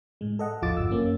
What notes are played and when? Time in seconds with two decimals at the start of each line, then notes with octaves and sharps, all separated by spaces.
0.21 A2 G#3
0.39 A4 D#5 F#5
0.62 A1 E2 F3 F4 D6 A6
0.77 G1 E6
0.91 F#2 A#3 C#4